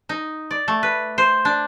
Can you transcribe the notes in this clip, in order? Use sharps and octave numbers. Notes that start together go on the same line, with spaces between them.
D#4
D5
A3
B4
C5
D4